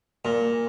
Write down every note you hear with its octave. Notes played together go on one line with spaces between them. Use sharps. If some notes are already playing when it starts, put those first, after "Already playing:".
A#2